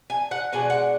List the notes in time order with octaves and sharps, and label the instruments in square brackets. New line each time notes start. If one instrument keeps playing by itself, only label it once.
[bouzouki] G#5
F#5
B2 G#3 D4 G#5
F#5